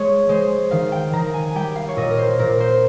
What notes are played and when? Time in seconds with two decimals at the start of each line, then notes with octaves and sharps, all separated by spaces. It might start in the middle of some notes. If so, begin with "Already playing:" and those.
Already playing: G#3 C#5
0.29 G#3 C5
0.71 D#3 F5
0.92 G5
1.13 D#3 A#5
1.34 G#5
1.55 G3 G5
1.76 F5
1.88 C#5
1.97 A#2 D#5
2.11 A#4
2.18 C5
2.39 A#2 A#4
2.60 C5